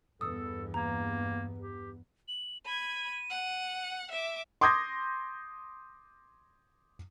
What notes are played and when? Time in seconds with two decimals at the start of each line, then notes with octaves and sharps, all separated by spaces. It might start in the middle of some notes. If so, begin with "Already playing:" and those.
0.21 E2 G2 B3 A4 D#6 E6
0.74 A#3 A#5
1.59 G4
2.28 F#7
2.65 B5 G#6 D#7
3.30 F#5
4.11 E5 D6
4.61 C6 D6 D#6 G6 G#6 A#6